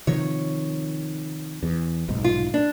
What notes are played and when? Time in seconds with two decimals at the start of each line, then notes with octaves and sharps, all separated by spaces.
0.07 C3 D#3 F3 C#5
1.63 E2
2.08 F1 B1 G#2
2.24 F4
2.54 D4